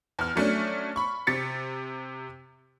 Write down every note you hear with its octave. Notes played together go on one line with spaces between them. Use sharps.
E2 F6
F#3 A3 C#4 D4
B5 C#6
C3 A6 B6 C#7